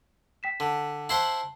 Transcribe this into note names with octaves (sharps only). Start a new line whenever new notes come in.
G5 B6 E7
D3
E4 C5 F#5 A5 C7 F#7